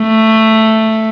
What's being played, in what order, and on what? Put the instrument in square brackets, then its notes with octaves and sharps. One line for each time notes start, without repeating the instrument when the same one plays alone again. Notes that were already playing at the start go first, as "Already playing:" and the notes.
Already playing: [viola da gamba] A3